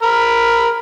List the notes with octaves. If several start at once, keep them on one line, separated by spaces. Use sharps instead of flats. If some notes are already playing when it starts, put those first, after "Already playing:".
A#4 B5